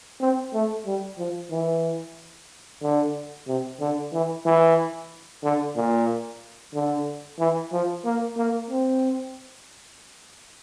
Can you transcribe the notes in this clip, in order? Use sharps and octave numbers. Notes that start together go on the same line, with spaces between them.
C4
A3
G3
F3
E3
D3
C3
D3
E3
E3
D3
A#2
D3
E3
F3
A#3
A#3
C4